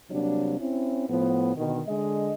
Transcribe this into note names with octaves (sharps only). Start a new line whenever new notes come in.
C3 F#3 G3 A#3 D4
C4 C#4 E4
A2 F3 B3
B2 D3 D#3
D3 G#3 D#5